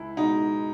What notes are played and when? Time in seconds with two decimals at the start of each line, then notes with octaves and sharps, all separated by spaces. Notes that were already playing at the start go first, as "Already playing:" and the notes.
Already playing: C#2 E4
0.17 B2 G#3 D#4